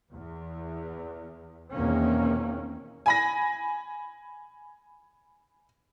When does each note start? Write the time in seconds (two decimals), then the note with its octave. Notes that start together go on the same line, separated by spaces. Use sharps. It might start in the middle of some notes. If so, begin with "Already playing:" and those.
0.13 E2
1.72 E2 B2 D#3 A#3 C4 C#4
3.06 G#5 B5 A#6